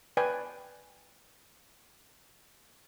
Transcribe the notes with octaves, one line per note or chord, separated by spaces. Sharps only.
B4 D5 G5 G#5